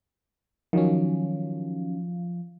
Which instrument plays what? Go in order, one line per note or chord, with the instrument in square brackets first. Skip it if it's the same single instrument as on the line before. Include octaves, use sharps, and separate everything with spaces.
[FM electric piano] D#3 F#3 C#4 [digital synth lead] F3